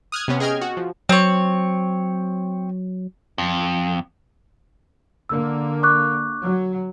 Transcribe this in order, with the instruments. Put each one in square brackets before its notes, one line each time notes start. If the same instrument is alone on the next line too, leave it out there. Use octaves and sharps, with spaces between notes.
[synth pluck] D#6 F6 F#6 G#6
C3 B3 C#4
G#4 D#5 G5 F6 G#6
F#4
F3
[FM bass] F#3 [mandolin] C4 C#5
[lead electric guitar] F2
[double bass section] D3 A#3 [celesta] E6
[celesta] C#6 D6 F#6
[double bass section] F#3